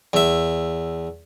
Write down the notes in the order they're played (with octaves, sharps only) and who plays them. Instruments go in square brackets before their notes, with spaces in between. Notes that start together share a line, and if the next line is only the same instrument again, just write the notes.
[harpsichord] E2 E5